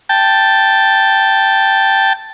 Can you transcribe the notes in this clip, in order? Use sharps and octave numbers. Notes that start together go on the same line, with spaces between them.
G5 A5